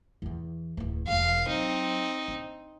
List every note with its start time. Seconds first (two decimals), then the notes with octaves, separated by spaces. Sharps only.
0.22 E2 E3
0.77 D1 E2
1.08 E1 E2 F5
1.48 F#3 C4 D#4
2.28 D4